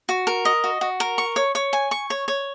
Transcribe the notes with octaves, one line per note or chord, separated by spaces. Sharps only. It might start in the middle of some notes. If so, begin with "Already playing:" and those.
F#4
A#4
D#5
F#4
F#4
A#4
C#6
C#5
C#5
G#5
C#6
C#5
C#5